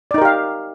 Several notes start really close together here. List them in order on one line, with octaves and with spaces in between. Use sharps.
D5 D#4 A#4 G4 F5